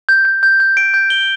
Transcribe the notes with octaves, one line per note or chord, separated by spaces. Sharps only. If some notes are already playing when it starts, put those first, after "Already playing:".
G6
G6
G6
G6
D7
G6
G7